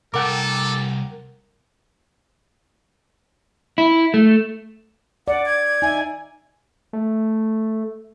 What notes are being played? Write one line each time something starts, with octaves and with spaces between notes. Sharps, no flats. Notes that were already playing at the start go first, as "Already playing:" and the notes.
C2 A4 A#4 F#5 G5 A5 D6
E4
A3
D5 F#5
G#6
D#4 E5 G#5
A3